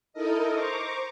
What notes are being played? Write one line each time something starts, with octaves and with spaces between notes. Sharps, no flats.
D#4 E4 A4 A#4 D#5
C5 A#5 C#6 D6